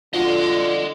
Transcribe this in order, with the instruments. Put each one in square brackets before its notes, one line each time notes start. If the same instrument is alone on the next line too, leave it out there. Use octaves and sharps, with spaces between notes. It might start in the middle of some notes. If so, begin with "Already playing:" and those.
[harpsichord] F2 F#4 [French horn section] D3 [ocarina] F4 [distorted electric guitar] D#5 C6